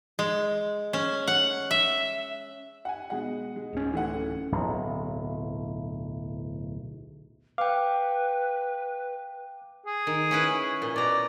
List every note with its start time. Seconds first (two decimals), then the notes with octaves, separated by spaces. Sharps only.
0.19 G#3
0.93 C#4
1.27 F#5
1.71 E5
2.85 F#5 G#5
3.10 B2 G#3 F#5
3.56 G#3
3.73 D1 C#4
3.93 E3 A3 F#5
4.52 D1 B1
7.58 B4 F5 G5 D6
9.86 G#4
10.07 D#3
10.31 C#4 E4 B4
10.82 A#2
10.96 B2 D5 A#5